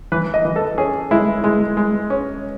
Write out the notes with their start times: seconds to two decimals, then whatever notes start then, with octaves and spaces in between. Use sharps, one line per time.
0.12 E3 B4
0.34 D#5
0.45 E3
0.56 A4
0.78 C#4 G#4
1.11 G#3 E4
1.44 G#3
1.77 G#3
2.10 C#4